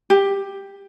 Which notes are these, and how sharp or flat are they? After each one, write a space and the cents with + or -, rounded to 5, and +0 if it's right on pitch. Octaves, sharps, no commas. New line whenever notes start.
G4 +10